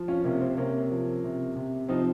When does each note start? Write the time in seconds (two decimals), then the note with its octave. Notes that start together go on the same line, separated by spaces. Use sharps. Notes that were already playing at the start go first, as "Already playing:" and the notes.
Already playing: F3
0.08 C#4 F4
0.24 C3 A#3 C#4
0.41 C4
0.57 C3 A#3 C#4
0.90 F3
1.24 C3
1.56 C3
1.89 F3 C4 D#4